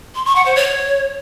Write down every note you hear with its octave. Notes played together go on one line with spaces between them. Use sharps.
C6
C#6
F#5
C5
C#5